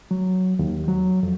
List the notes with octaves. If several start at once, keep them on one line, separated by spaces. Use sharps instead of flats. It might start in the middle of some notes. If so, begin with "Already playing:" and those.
F#3
D#2
F#3
F2